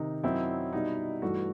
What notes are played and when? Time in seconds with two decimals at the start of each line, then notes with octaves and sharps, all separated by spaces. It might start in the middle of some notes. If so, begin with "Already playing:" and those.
Already playing: C3 D#3 D#4
0.23 F#2 F#3 C4 D#4 E4 F#4
0.73 B2 G3 B3 D#4
1.22 G2 E3 A3 F#4